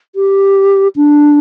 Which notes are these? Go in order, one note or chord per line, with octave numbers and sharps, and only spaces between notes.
G4
D4